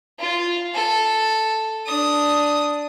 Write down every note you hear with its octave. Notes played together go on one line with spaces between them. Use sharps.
F4
A4
D4 D#6